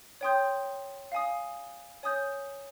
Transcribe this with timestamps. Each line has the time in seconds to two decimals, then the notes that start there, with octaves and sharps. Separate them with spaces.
0.21 C#5 G5 C6 D#6 G6
1.12 F5 G#5 D#6
2.03 C#5 G#5 D#6 G6